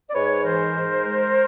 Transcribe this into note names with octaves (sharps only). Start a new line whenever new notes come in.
D5
G#2 B4 C#5
E3 A#4 C5
G#2
G#3